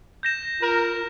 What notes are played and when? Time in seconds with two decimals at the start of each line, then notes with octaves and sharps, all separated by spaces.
0.23 G6 A#6 E7
0.60 F4 A#4